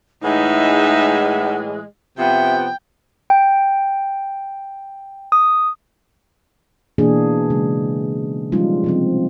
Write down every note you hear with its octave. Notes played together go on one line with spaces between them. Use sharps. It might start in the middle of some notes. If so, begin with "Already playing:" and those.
A2 E3 G#3 D#4 E5 F#5
C3 F3 B3 E5 G5
G5
D#6
B2 E3 A#3 D4 G#4
C#3 G#3
F3 G3 G#3 C#4 D#4 F4
C3 F3 C4